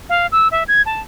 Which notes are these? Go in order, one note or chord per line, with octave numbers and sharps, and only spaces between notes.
F5
E6
E5
G#6
A5